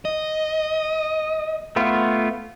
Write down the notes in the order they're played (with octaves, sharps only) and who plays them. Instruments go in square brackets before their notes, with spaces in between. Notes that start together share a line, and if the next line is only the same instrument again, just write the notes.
[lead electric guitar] D#5
[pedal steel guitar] A3 B3 F4